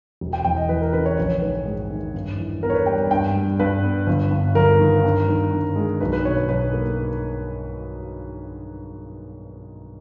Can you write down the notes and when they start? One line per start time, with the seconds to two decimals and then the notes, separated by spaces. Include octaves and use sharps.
0.21 E1
0.33 G5
0.45 E2 G5
0.57 D#5
0.69 E3 B4
0.82 A#4
0.93 C#3 B4
1.06 C#5
1.17 A#1 C#5
1.42 G#2 B4
1.65 G#3
1.91 D#3
2.14 G2
2.38 E3
2.63 B3 A#4
2.70 C#5
2.74 B4
2.86 G3 G5
3.11 G2 G5
3.35 G3
3.59 G2 B4
3.83 B3
4.07 G1
4.31 G2
4.55 G1 A#4
4.79 D#3
5.04 G2
5.28 D#3
5.52 G2
5.76 G#3
6.01 B1 B4
6.13 B4
6.25 B2 C#5
6.37 B4
6.48 B1 B4
6.74 A#3